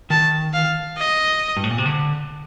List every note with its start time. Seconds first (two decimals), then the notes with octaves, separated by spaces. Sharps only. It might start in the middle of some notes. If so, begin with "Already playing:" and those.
0.10 D#3 A5
0.53 F5
0.98 D#5
1.57 G2
1.64 A2
1.71 A#2
1.78 C3
1.86 D3